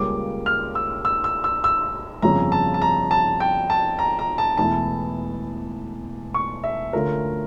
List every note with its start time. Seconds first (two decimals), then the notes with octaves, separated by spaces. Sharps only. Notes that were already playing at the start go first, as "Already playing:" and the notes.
Already playing: C#2 C#3 G3 A#3 C#4 D6
0.46 F6
0.75 E6
1.05 E6
1.24 E6
1.44 E6
1.64 E6
2.22 G1 F2 C#3 F3 C#4 A#5
2.52 A5
2.74 A5
2.82 A#5
3.11 A5
3.40 G5
3.70 A5
3.99 A#5
4.19 A#5
4.38 A5
4.57 E1 E2 E3 A3 E4 A5
6.34 C#6
6.64 E5
6.93 D2 D3 A3 C#4 F4 A#4